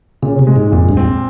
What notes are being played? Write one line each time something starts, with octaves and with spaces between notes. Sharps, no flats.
A#2 C#3
C3
G#3
G#2
F2 A#2
G2
F2 C4